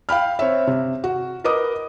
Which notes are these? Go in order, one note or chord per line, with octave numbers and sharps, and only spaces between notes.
F5 G5 B5 F6
C4 C#5 E5
C3
F#4
A#4 B4 D#5 D6 D#6